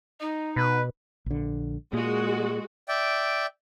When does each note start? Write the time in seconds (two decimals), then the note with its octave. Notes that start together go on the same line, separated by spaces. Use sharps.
0.20 D#4 D#5
0.56 B2 B4
1.26 A#1 D3
1.93 A#2 G#3 F#4
2.88 D5 E5 G5